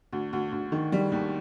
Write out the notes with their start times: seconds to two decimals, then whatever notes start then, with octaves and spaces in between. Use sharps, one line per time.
0.13 D2
0.33 D2
0.52 D2
0.72 D#3
0.92 G3
1.12 D#2